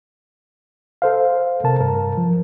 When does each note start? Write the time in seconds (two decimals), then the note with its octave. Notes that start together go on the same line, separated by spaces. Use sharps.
1.02 A4 C5 F5
1.64 C3 A#4 A5
1.81 G2 A#4
2.17 F3